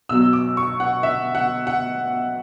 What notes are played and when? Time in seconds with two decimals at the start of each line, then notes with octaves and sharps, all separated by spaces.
0.09 B1 B2 F#3 E6
0.33 D6
0.57 C#6
0.80 F#5
1.03 E5
1.35 F#5
1.67 F#5